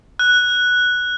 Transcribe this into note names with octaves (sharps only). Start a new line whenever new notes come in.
F#6